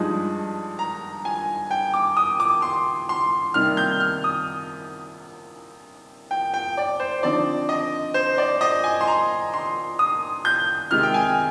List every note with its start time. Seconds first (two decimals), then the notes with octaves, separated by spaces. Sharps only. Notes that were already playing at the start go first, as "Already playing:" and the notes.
Already playing: G2 F3 G#3 D#4
0.79 A#5
1.25 G#5
1.71 G5
1.94 D6
2.17 D#6
2.40 D6
2.62 C6
3.09 C6
3.54 C3 D#3 G3 A#3 D#4 F6
3.77 G6
4.00 F6
4.24 D#6
6.31 G5
6.54 G5
6.77 D5
7.00 C5
7.23 D3 F3 C4 D#4 D5
7.69 D#5
8.14 C5
8.38 D5
8.61 D#5
8.84 G#5
9.01 C6
9.07 A#5
9.54 C6
9.99 D#6
10.45 G6
10.91 C3 D#3 G#3 D#4 F6
11.03 G5
11.14 G#5